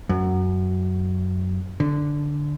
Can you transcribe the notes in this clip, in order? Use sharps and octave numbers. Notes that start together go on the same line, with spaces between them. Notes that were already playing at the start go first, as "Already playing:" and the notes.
F#2
D3